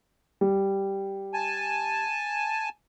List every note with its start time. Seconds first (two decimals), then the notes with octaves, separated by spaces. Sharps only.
0.41 G3
1.34 G#5 A5